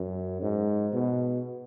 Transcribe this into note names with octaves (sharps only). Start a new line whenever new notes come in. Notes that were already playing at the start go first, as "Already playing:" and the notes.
Already playing: F#2
G#2
B2